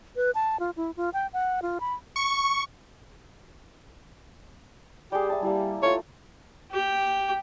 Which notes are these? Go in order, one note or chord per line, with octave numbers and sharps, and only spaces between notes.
B4
A5
F4
E4
F4
G5
F#5
F4
B5
C#6
G3 G4 G#4
E5 A5
G3 A#3 E4
A3 F4 C#5
G4 G5